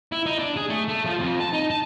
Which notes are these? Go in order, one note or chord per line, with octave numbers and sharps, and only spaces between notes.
E4
D#4
D4
G#4
A3
A3
F3
F2
A5
D#4
A5